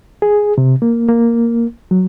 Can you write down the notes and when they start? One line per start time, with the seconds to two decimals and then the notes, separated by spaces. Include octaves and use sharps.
0.22 G#4
0.58 C3
0.82 A#3
1.08 A#3
1.91 F#3